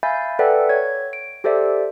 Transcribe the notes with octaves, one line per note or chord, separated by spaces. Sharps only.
E5 F5 G#5 B5 G6 A6
A4 B4 D5 E5 F#5 G5
C#5 G#6
D7
G4 A4 C5 D5 E5